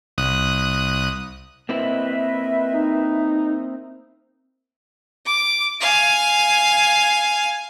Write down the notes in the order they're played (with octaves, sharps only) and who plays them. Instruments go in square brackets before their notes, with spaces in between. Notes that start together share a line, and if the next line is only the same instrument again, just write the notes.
[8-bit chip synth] C2 D#6 F#6
[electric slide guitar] A#3 C4 E4 [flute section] B4 D#5 E5
[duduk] D#4
[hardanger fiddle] D6
F5 G#5